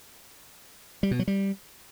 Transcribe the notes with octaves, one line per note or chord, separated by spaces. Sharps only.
G3
B2
F#3
G3